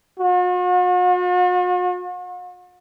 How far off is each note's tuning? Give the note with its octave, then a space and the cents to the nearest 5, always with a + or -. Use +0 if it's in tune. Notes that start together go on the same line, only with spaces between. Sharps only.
F#4 -45